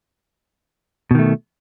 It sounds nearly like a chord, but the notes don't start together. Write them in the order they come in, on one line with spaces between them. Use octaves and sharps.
B2 D#3 A3